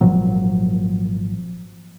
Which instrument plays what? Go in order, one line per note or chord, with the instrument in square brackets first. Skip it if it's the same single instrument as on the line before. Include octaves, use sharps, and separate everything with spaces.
[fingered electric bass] G#1 A#2 F3 F#3